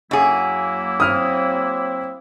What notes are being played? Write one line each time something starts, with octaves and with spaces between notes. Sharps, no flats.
F#2 F#3 A#3 E4 G#4
C4 D#6 F6